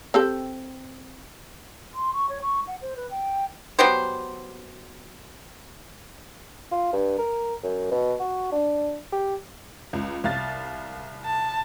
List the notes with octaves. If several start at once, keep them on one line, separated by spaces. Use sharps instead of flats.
C4 G4 A4
C6
C#6
C#5
C#6
F#5
C5
B4
G5
F#3 B3 G4 C5
F4
G2
A#4
F#2
B2
F#4
D4
G4
C#2
C2 F5 A6
A5